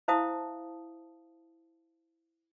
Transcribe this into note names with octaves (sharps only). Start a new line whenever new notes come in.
E4 C5 E5 F5 A5 D#6